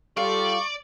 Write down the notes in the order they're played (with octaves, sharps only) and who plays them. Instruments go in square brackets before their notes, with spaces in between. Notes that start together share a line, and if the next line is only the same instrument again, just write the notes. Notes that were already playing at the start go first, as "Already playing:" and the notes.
[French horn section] G3 A4 [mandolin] F4 [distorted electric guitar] D5 [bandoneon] C#6